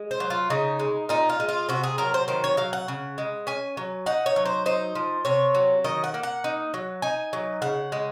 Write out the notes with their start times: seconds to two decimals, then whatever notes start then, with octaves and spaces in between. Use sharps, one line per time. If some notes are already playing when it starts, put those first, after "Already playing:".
Already playing: G#3
0.11 C5
0.20 F#3
0.30 F4
0.50 C#3 D#4
0.79 G#3
1.09 A#2 D#4
1.29 F4
1.40 G#3
1.49 F4
1.69 C3 F#4
1.83 G#4
1.98 F#3 A#4
2.14 C5
2.28 D#3 C5
2.44 C#5
2.57 F#3 F5
2.73 F#5
2.88 C#3
3.18 G#3
3.47 C#4 G#5
3.77 F#3
4.06 D#4 F#5
4.26 C#5
4.36 F#3
4.46 C5
4.66 D#4 C5
4.95 F3
5.25 C3 C#5
5.55 F#3
5.84 D#3 D#5
6.04 F#5
6.14 A#3
6.23 F#5
6.44 D#4
6.74 F#3
7.02 D#4 G#5
7.33 F#3
7.62 C#3 F#5
7.92 G#3